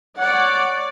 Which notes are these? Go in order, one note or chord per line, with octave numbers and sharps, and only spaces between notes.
C#5 D5 F#5